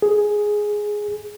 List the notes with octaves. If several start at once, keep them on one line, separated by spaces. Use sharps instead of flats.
G#4